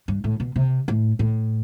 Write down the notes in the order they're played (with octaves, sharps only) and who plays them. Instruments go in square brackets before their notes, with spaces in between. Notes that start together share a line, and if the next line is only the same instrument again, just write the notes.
[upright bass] G2
A2
B2
C3
A2
A2